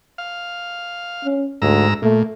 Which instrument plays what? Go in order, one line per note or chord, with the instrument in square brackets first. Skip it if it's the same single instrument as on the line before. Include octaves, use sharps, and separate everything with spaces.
[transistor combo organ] F5
[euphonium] C#4
[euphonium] D2 [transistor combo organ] G#2 A#5 E6
[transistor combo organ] A#2 [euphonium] A3